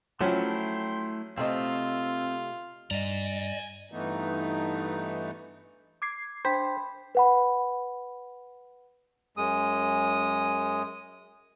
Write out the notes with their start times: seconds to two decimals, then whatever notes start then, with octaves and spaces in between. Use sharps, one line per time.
0.21 F3 F#3 A3 C#4 E4 G5 C6
1.38 C3 A3 C4 F4 D#5
2.91 G2 D5 D#5 G#5 A#5
3.92 G2 E3 A3 B3 D#4
6.02 D6 G#6 C7
6.45 D4 C5 G5 B5 B6
7.15 B4 F#5 B5
9.37 F#2 G#3 D#6